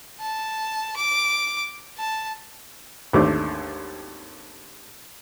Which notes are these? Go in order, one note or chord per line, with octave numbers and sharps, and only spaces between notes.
A5
D6
A5
G#1 D#2 D3 A3 C5 D6